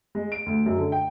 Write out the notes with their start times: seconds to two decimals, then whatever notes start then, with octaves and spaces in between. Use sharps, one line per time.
0.15 G#3
0.32 D7
0.46 D2
0.66 F#2
0.78 D3
0.92 G5